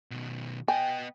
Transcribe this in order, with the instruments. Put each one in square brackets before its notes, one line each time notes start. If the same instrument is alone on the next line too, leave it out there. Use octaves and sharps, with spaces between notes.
[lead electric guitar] B2 D#3
[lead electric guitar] B3 D#5 [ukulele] G5 [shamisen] G#5